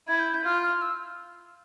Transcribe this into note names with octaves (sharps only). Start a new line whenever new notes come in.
E4 G#6
G6
G6
F4 F6
F6
E6